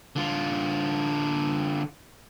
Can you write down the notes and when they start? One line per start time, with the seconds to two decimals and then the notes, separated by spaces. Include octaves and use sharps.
0.16 D3 F4